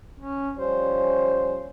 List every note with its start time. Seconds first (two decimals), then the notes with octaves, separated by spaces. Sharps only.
0.20 C#4
0.57 F3 G3 C#4 C5